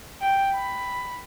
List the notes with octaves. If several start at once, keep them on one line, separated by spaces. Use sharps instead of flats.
G5
B5